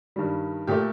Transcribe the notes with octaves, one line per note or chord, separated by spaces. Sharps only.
G2 D#3 G3
A#2 A3 G4